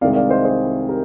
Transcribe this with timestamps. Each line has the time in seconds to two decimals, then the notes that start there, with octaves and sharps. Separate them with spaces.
0.01 C2 C3 D#3 G#3 D5 F5
0.16 D5 F5
0.30 C5 D#5
0.44 G#4 C5
0.89 G4 A#4